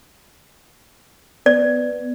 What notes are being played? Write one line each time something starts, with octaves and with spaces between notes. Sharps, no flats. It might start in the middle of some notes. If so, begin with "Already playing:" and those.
B3 D5